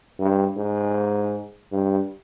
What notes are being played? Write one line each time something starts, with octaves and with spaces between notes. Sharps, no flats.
G2
G#2
G2